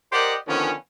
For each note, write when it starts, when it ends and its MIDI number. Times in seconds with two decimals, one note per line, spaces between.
0.13 0.34 67
0.13 0.34 70
0.13 0.34 72
0.13 0.34 74
0.13 0.34 75
0.13 0.34 78
0.48 0.72 50
0.48 0.72 51
0.48 0.72 53
0.48 0.72 59
0.48 0.72 61